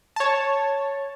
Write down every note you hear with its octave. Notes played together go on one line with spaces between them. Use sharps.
C#5 A5